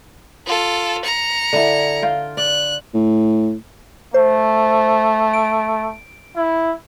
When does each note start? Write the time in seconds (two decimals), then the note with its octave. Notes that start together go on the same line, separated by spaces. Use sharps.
0.46 F4 A4
1.05 A#5 C#7
1.53 D3 E4
2.02 F4 G5
2.37 D5 F#6
2.94 A2
4.14 A3 C5
5.33 D7
6.36 E4